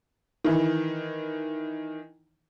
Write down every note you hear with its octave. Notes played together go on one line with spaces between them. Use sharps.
D#3 E3